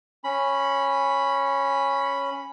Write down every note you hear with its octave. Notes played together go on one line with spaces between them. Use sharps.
C#4 B5